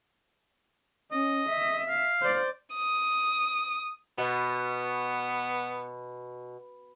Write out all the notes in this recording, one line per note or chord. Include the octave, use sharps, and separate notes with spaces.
C#4 D#5
E5
F5
C5 D5
D#6
B2 B3